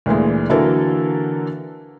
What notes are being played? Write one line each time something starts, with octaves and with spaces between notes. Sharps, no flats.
D2 A#2 E3 G#3
D3 E3 F#3 A#3 A4 A#4